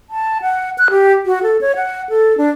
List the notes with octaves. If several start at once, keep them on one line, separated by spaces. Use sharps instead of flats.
A5
F#5
F#6
G4
F#4
A4
C#5
F#5
A4
D4